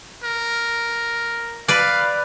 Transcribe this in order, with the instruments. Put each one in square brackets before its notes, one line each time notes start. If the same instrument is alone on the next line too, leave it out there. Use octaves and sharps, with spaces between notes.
[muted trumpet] A#4
[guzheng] B4 D5 [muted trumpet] F5